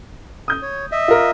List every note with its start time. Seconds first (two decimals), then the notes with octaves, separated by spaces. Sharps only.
0.48 D#6 G6
0.62 C#5
0.92 D#5 E5
1.08 F4 A#4